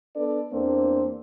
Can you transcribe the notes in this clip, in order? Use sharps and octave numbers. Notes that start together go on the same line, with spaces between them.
B3 D4 A4 B4 D5
E2 A#3 C4 D4